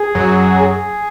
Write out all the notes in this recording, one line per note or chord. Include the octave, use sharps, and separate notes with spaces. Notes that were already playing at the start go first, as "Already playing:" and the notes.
Already playing: G#4
F#2 F#3
G#4